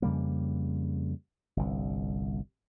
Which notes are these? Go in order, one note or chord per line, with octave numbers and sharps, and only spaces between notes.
F2 C#3 G3 A#3
G1 C2